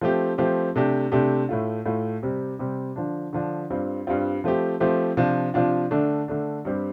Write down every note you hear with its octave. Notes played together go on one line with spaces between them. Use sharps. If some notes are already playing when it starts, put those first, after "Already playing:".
F3 A3 C4 G4
F3 A3 C4 G4
C3 A3 D4 G4
C3 A3 D4 G4
A2 A3 F4
A2 A3 F4
C3 G3 C4 G4
C3 G3 C4 G4
D3 F3 D4
D3 F3 D4
G2 G3 C4 F4
G2 G3 C4 F4
F3 A3 C4 G4
F3 A3 C4 G4
C3 F3 D4 F4
C3 F3 D4 F4
D3 A3 D4
D3 A3 D4
G2 G3 C4 G4